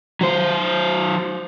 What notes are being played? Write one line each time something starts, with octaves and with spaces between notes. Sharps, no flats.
F#3 C5